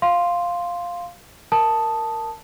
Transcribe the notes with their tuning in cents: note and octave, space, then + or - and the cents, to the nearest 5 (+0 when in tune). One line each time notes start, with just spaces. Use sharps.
F5 +0 C6 +0
A#4 +0 A5 +0 D#6 +0